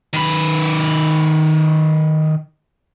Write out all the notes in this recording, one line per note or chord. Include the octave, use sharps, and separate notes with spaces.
D#3 B4